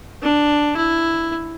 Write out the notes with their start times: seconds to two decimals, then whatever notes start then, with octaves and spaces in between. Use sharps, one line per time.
0.22 D4
0.76 E4